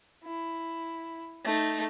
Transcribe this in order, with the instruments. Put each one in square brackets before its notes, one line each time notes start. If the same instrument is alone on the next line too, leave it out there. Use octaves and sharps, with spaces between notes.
[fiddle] E4
A3 D#4